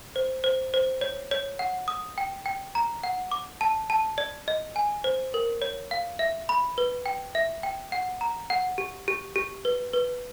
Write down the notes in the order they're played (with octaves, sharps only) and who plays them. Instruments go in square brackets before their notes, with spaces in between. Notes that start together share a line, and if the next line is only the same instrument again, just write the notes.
[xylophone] C5
C5
C5
C#5
C#5
F#5
D#6
G5
G5
A#5
F#5
D6
A5
A5
D5
D#5
G#5
C5
A#4
C#5
F5
E5
B5
B4
G5
E5
G5
F#5
A#5
F#5
G4
G4
G4
B4
B4